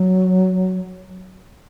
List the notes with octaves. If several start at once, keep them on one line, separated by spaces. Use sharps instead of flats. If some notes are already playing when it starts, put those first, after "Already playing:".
Already playing: F#3